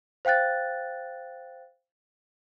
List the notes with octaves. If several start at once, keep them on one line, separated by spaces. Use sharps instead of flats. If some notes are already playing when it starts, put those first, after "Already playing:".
C5 F5 G5 F#6 A6